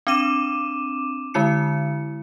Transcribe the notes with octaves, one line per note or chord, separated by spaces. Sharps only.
C4 D4 D6 D#7 E7
D3 G#3 E4 C#7